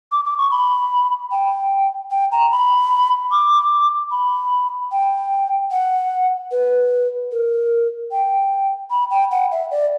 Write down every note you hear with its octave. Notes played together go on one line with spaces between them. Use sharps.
D6
D6
C#6
B5
G5
G5
A#5
B5
D6
B5
G5
F#5
B4
A#4
G5
B5
G5
F#5
E5
D5